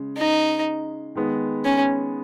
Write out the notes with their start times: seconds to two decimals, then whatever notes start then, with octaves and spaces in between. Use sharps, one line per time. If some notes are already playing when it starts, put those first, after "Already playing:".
Already playing: C#3 G#3
0.17 D#4
1.15 D#3 G#3 B3
1.65 C#4